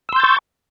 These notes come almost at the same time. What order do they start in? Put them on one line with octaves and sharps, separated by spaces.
E6 C6 G6 A6 C#6